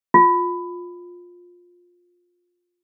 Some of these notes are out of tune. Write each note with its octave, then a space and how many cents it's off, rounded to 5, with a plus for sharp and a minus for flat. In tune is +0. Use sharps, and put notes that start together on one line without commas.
F4 +20